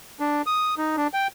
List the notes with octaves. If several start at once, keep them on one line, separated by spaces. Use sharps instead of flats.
D4
D#6
D#4
D4
G5